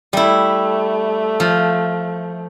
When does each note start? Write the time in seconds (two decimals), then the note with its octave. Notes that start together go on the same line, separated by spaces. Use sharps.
0.13 G3 A3 E4
1.40 F3